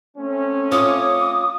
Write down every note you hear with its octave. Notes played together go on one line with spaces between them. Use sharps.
A3 C4 C#4
F4 C#5 D6 D#6